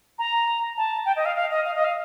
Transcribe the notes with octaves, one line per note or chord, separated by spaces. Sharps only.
A#5
A5
G5
D#5
F5
F5
D#5
F5
D#5
F5